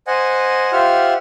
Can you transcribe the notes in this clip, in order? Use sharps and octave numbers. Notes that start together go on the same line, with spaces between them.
C5 D#5 F#5 G#5
F4 G4 C5 E5 F#5 F6